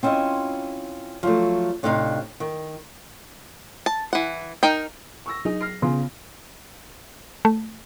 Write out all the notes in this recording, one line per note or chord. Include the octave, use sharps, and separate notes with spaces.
C4 C#4 E4 F4 D#5
F3 F#3 A3
A2 C3 D4 D#4 D5 F5
D#3
A5
E3 F#5
D#4 A#4 G5
C#6 E6 A#6
F#3 D#4 G#4
F6 A#6 C7
C#3 B3 F4 G#5 C6
A3